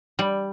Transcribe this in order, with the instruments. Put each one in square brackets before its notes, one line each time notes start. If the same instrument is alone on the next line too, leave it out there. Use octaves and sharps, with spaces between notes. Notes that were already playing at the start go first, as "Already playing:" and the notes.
[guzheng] G3